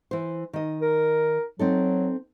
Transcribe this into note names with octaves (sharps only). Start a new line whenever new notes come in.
E3 C5
D#3 D#5
A#4
F#3 C4 D#4 A4